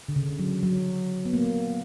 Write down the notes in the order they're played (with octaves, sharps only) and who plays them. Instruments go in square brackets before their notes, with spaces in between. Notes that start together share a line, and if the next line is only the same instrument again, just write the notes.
[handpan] D3
C#3
F#3
F#3
B3
A#3